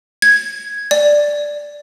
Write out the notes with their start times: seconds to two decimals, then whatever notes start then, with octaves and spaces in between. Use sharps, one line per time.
0.22 G#6
0.91 D5